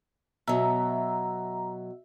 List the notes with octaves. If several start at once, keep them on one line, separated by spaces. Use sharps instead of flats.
B2 F#3 E5 A#5